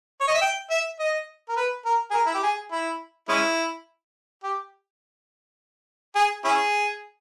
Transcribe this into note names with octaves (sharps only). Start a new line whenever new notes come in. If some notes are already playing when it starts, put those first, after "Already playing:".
C#5
D#5
E5
G5
E5
D#5
A#4
B4
A#4
G#4
A#4
E4
G4
G#4
E4
G#3 C#4 E4
G4
G#4
C#4 E4 G#4